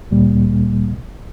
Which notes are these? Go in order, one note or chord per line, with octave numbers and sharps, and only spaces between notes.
D2 A#2 G3 A#3